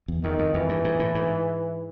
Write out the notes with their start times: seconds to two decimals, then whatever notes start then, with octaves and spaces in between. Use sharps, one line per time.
0.08 E2
0.24 E2 D#3
0.39 F2
0.54 F2 E3
0.69 G2
0.84 G#2
0.99 A2
1.15 G#2